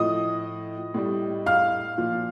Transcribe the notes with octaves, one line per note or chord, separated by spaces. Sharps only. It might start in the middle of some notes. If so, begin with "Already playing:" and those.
Already playing: A2 F3 D#5 D#6
A2 G3
F5 F6
A#2 F3